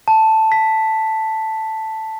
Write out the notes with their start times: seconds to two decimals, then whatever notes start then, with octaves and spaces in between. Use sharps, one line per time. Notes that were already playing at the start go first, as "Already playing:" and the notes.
0.08 A5
0.52 B6